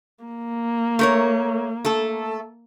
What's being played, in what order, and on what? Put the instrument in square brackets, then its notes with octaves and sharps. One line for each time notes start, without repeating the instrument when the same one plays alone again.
[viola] A#3
[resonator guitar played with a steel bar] A3 A#4 C#5
A3 A4